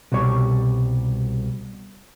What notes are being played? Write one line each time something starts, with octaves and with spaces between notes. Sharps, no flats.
C2 B2 G3 C#5